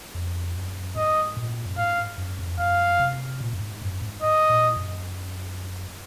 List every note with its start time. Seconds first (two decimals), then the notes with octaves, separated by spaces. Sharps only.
0.15 F2
0.55 F#2
0.96 G#2 D#5
1.37 A#2
1.66 F#2
1.77 G#2 F5
2.18 F#2
2.39 F2
2.59 F#2 F5
2.99 C3
3.41 A#2
3.53 F#2
3.61 G#2
3.82 F#2
4.02 G#2
4.22 D#5
4.50 A#2
4.77 F#2